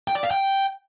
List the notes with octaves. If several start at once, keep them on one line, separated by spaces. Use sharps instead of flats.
G5
D5
F5
G5